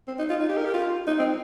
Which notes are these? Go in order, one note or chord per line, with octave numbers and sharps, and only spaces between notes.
C4
D#4
F4
D#4
G4
A#4
G4
F4
D#4
C4